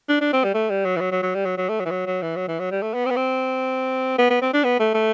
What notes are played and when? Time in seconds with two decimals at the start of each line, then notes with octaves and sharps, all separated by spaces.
0.09 D4
0.21 D4
0.33 C4
0.44 G3
0.54 A3
0.70 G3
0.85 F#3
0.96 E3
1.00 F#3
1.12 F#3
1.23 F#3
1.35 G3
1.45 F#3
1.57 F#3
1.69 A3
1.80 F#3
1.86 E3
1.91 F#3
2.06 F#3
2.22 E3
2.36 F#3
2.48 E3
2.60 F#3
2.71 G3
2.82 A3
2.94 B3
3.06 C4
3.10 B3
3.16 C4
4.19 B3
4.30 B3
4.41 C4
4.53 D4
4.64 B3
4.80 A3
4.94 A3